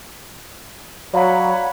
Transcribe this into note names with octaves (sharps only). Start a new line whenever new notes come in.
F#3 C#5 D5 F5 F#5 A#5 B5